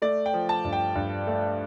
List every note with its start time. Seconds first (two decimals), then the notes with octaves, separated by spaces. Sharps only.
0.02 A3 D5
0.26 G5
0.33 F3
0.49 A5
0.65 G2
0.73 G5
0.95 G2
1.27 A3